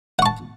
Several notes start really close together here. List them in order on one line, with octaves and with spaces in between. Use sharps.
F#5 C#6 A5